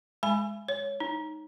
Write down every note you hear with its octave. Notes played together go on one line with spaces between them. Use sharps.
G#3 G#5 B5
C#5
D#4